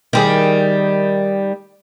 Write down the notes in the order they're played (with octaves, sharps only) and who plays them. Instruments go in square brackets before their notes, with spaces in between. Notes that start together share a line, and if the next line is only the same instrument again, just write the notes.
[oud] D#3 G3 G#4